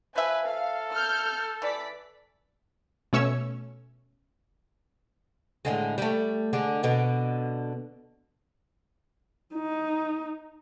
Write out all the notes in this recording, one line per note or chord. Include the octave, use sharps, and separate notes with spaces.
F3 B4 E5 G#5
A4 F5
F6 G6
E3 D5 B6
B2 A3 C#4 C#5 E6
A2 D3 G#3
G3 A3
D3 G#3 D4
B2 D3
D#4